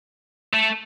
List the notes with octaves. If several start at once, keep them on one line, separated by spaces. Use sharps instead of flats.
A3